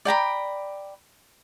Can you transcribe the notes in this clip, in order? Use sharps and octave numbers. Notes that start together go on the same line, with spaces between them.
D5 G5 A#5 B5